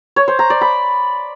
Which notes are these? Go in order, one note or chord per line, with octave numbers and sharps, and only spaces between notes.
C#5
C5
A#5
D5
B5